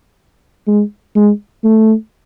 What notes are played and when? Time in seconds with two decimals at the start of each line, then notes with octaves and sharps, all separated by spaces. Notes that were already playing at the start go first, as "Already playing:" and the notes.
0.67 G#3
1.16 G#3
1.64 A3